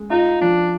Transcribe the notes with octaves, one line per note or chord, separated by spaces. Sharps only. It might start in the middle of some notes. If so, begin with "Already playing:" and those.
Already playing: G#3
D#4 F4
F3 D4